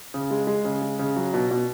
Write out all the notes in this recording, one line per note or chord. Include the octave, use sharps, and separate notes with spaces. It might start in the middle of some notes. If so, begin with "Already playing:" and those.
C#3
G#3
G#3
C#3
G#3
C#3
F#3
B2
B2